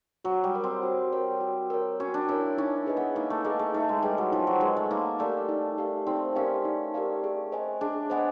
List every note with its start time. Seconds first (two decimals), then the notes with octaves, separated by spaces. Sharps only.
0.24 F#3 F#4
0.44 G3
0.55 A#4 C#5
0.64 C4
0.83 F#4
1.13 A#4 C#5
1.41 F#4
1.70 A#4 C#5
2.00 C#4 F#4
2.14 D4
2.29 E4 A#4 C#5
2.58 C#4 D#4
2.86 G#4 B4 D#5
2.97 B3
3.16 A#3 D#4
3.30 A3
3.44 A#3 G#4 B4 D#5
3.59 A3
3.74 A3 D#4
3.89 G#3
4.03 G3 G#4 B4 D#5
4.18 F#3
4.32 F3 D#4
4.47 F#3
4.61 G#3 G#4 B4 D#5
4.76 A3
4.91 A#3 D#4
5.19 A3 G4 A#4 D5 F5
5.49 D#4
5.78 G4 A#4 D5 F5
6.07 C4 D#4
6.36 C#4 G4 A#4 D5 F5
6.65 D#4
6.94 G4 A#4 D5 F5
7.24 G#4
7.52 C5 D#5 G#5
7.81 D4 G#4
8.10 B3 C5 D#5 G#5